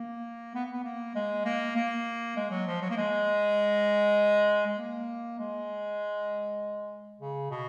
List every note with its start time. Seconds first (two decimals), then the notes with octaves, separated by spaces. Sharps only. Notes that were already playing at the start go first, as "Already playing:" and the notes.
Already playing: A#3
0.55 B3
0.72 B3
0.84 A#3
1.15 G#3
1.45 A#3
1.76 A#3
2.36 G#3
2.50 F#3
2.66 F3
2.81 F#3
2.90 A#3
2.97 G#3
4.67 G#3
4.78 A#3
5.39 G#3
7.20 C#3
7.51 B2